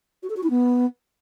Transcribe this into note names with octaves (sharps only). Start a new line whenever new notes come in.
F#4
A4
F#4
E4
B3